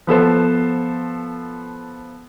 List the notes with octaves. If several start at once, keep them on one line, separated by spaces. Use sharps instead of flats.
F3 B3 A4 C5